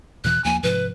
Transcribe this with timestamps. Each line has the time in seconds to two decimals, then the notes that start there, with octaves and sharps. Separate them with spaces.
0.24 E2 B2 E3 F#6
0.44 D#2 F3 A#3 G#5
0.63 G#2 C3 F3 B4